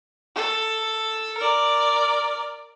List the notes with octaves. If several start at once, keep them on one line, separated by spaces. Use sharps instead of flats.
A4
A#4 D5